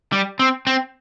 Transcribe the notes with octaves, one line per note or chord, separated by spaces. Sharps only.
G3
C4
C4